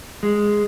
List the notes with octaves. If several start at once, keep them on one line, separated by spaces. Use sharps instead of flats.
G#3